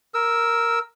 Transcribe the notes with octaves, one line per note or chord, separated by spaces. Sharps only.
A#4 E6